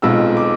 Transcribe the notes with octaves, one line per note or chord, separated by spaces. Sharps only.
B1 B2 G#3 C4 F4 E6
D6